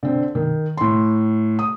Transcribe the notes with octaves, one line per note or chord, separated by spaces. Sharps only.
D3 C4
D#3
A2 C6
D#6